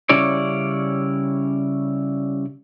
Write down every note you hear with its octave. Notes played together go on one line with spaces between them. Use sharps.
C#3 G3 C#4 E4 C#5 D5